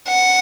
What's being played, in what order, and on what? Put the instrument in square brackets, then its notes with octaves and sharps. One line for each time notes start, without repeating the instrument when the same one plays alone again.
[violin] F#5